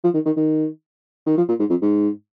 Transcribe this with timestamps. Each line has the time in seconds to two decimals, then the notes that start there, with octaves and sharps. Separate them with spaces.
0.04 F3
0.14 D#3
0.25 D#3
0.37 D#3
1.26 D#3
1.37 F3
1.49 A#2
1.59 G#2
1.70 F2
1.82 G#2